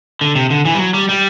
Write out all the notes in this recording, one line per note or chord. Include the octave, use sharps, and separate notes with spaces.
D3
C3
D3
E3
G3
F#3
G3
G3